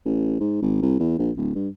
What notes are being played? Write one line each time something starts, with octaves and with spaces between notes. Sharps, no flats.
A1
G#2
G#1
C2
E2
A#1
D1
G2